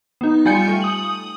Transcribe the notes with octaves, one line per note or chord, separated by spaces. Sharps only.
B3 D#4
G3 F4 G5 G#5 G6 C#7
A3
D#6 F#7